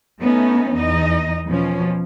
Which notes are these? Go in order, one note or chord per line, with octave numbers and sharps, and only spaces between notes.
A3 B3 C#4 D#4
E2 D#4 D#5
B2 F3 C#4